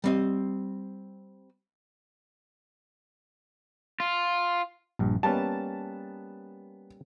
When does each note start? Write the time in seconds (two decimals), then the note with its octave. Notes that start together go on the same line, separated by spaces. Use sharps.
0.04 G3 C4 D#5
4.00 F4
4.99 A#1 G2
5.23 G3 A#3 B3 C#4 A5